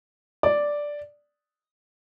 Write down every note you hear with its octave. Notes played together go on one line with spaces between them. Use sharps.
D5